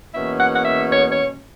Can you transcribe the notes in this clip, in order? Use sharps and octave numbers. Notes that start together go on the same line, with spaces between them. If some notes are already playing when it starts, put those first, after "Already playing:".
E2 B2 A#3 C#4 E5
F#5
F#5
E5
C#5
C#5